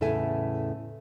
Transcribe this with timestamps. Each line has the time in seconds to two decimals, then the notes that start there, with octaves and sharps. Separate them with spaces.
0.01 E2 A2 C#3 A4 E5 G#5